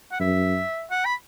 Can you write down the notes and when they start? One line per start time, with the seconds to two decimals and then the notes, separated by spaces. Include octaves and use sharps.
0.12 F#5
0.20 F#2 E5
0.91 F#5
1.05 B5